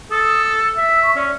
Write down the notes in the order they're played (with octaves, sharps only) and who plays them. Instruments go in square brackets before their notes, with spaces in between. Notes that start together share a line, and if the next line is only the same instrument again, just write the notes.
[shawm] A4 [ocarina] D#6
[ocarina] E6
[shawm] E5
[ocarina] C#6
[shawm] C#4 [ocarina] D5